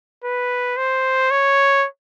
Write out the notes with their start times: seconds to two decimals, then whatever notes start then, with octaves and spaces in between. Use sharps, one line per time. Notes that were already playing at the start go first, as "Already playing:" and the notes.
0.24 B4
0.77 C5
1.31 C#5